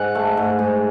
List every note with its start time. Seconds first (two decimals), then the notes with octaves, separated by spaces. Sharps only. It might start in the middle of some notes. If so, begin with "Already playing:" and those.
Already playing: G#2 F#5
0.15 A3
0.37 G#2
0.59 G#2